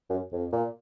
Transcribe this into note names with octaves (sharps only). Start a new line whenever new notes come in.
F#2
F2
A#2